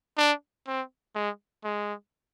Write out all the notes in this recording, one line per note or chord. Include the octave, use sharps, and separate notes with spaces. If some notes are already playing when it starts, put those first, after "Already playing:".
D4
C4
G#3
G#3